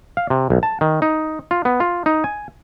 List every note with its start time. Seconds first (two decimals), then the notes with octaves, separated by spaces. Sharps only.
0.17 F5
0.30 C3
0.50 B1
0.63 A5
0.81 D#3
1.02 D#4
1.51 F4
1.65 B3
1.80 F4
2.06 D#4
2.24 G#5